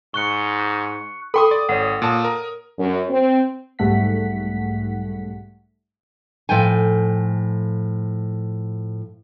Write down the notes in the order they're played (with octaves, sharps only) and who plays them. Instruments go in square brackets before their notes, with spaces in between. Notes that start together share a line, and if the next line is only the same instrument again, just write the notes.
[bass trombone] G#2 [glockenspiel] C#6 F#6 C#7
[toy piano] A4 G5 D6 [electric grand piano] B5 C6 D#6
[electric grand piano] D5
[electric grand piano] G#1 [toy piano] C#5 F#5
[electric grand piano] A#2 A5 D#6
A#4
[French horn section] F#2
C4
[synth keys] B1 G#2 G3 A3 F#5 B6
[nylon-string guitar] A2 F3 A4 G5 G#5